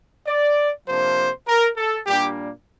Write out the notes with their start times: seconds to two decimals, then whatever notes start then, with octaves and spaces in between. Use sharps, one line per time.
0.26 D5
0.86 C3 F3 A#3 D4 C5
1.47 A#4
1.77 A4
2.07 A#2 G3 A#3 D4 G4